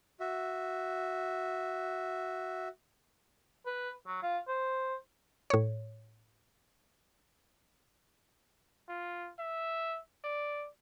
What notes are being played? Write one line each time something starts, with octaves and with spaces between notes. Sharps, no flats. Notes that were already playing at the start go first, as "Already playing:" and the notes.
F#4 E5
B4
F#3
F4
C5
A2 C#5
F4
E5
D5